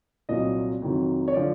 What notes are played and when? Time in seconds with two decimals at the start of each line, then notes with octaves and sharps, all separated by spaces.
0.29 C2 A#2 F#3 D#5
0.82 F2 C3 D#3 F#3
1.28 C#5
1.34 D3 F3 D5